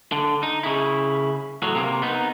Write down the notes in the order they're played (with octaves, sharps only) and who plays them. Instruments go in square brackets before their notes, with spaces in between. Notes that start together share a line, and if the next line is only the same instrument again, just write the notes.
[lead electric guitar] D3
D#4
C#3 E4
A2 F#3
C3 A#3
B3 D#4